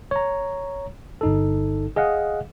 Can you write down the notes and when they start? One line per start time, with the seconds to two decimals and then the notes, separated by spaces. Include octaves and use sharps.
0.11 C#5 A#5
1.21 G1 D#4 A4
1.96 G#4 D#5 F5 F#5